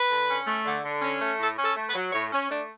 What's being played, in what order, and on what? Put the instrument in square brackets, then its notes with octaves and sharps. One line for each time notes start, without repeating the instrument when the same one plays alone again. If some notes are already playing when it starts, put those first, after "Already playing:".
Already playing: [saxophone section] B4
D3
C#4
A3
D3
D3
C#4
A3
A2 A4
C#4
A4
A3
B4
F#3
A2 C#5
C#4
A3 D4